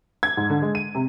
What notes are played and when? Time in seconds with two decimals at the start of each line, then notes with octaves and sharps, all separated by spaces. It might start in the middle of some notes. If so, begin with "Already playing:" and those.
0.23 G#6
0.37 G#2
0.50 D3
0.62 G#3
0.75 D#7
0.95 C3